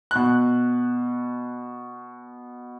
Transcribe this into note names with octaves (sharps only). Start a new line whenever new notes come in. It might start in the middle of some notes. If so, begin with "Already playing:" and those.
B2 F#6